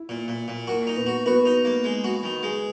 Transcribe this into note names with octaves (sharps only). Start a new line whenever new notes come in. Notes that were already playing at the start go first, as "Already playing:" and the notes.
Already playing: E4
A#2
A#2
A#2
A#3 F#4
D#4
B3
F#4
B3 F#4
D#4
A#3
G#3
F#4
D#3
G#3